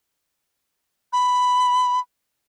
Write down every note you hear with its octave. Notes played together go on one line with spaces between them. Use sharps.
B5